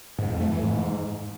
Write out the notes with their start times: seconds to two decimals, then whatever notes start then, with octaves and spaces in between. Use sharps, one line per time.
0.19 G#2
0.30 F2
0.41 A3
0.52 E3
0.63 G#2